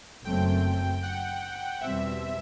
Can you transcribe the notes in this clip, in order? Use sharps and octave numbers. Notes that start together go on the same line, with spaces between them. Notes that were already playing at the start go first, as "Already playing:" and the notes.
F#1 F#2 F#3 A3 C4 G5
F#5
E2 B2 G3 C4 E5